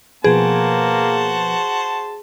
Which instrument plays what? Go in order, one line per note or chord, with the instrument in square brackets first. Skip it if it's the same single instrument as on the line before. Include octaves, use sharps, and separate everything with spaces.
[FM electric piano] B2 F3 B4 [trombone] A#3 [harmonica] F#4 C5 A5 [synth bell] G#4